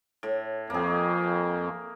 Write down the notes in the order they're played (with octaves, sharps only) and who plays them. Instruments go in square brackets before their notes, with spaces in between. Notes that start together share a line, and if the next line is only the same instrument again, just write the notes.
[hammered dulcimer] A2
[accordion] F2 [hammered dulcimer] A#3 G#4